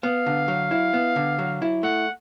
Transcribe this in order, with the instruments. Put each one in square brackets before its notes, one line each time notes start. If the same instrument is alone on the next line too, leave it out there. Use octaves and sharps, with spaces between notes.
[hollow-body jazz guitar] B3 [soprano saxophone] F5
[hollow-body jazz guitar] D3
F#3
E4
B3
D3
F#3
E4
[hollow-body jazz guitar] A3 [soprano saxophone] F#5